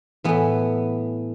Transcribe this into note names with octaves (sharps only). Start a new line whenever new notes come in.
A2 E3 B3